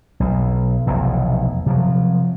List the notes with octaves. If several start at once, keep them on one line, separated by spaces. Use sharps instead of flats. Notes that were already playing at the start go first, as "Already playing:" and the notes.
B1
F1 B1 E2
C3 F3 F#3